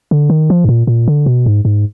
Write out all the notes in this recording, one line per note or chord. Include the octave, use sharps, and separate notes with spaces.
D3
D#3
F3
G#2
A#2
A#2
D3
B2
G#2
G#2